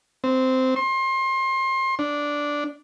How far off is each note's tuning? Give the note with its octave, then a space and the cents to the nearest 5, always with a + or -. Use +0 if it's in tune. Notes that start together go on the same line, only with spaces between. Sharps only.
C4 -10
C6 +30
D4 -5